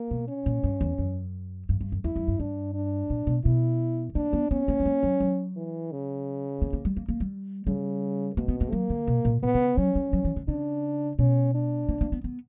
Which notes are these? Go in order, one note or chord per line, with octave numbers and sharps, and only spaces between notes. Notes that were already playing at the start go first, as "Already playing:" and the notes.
Already playing: A#3
B2
C#4
A#2
G2
E2
F#2
G2
G2
F#2
E2 E4
F#2
G2
G2 D4
D4
A#2
B2
B2 E4
A#3 D4
B3
B3 C#4
A#3
G3
A#3
F#3
F#3
E3
C#3
A#3
A#3
G3
A#3
A#3
G3
C#3 G3
B2 A#3
B3
A#3
F#3 A#3
D3
B2
A#2
A#2 B3
C#3
F#3 C#4
G3
F#3
E3
D3
C#3 D4
B2 C#4
D4
A#3
A#3
B3
B3